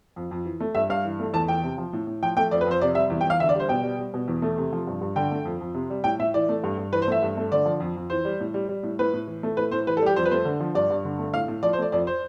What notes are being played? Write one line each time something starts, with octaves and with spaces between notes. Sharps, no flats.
F2
F2
E3
A3
G2 E5
G2 F5
E3
A3
E2 A5
E2 G5
C3
F3
A2
A2
F3 G5
A3 G5
F2 D5
B4
F2 C5
C3 D5
G3 E5
E2
G5
E2 F5
D3 E5
D5
G3 C5
B2 G5
G3
G3
B2
E2
A3
C3
F3
G2
G2
D3 G5
A3
F2
F2
C3
G3
A2 G5
A2 E5
E3 D5
A3
G2
G2
E3 B4
C5
A3 E5
G2
A3
D3 D5
F3
F2
F2
E3 C5
G3
A2
G3
G3
A2
A2 B4
A2
E3
A3
A2 B4
A2 C5
E3 B4
A4
G3 G4
F2 C5
B4
A3 C5
D3
F3
G2 D5
G2
D3
A3
A2 F5
A2
F3 D5
C5
A3 D5
F2 D5
C5